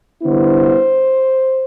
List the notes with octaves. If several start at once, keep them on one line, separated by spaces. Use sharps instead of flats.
D3 G3 B3 E4 C5